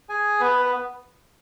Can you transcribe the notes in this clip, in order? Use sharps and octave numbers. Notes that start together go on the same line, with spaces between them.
G#4 G#5
B3 B4
B4